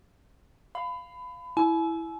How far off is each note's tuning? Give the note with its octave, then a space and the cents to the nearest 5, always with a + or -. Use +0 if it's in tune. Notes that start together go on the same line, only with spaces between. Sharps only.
F5 +0 B5 +25
E4 +0 G#5 +45